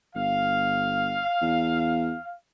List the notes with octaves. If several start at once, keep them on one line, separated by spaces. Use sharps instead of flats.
G1 F5
E2